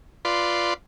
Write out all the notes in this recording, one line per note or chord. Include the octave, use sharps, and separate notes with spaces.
F4 B4 D5 C6